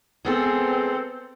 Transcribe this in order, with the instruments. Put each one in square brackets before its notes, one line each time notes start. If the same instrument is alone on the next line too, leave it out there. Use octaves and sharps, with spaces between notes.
[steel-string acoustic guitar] G#3 B3 G#4 [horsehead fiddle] C4 A4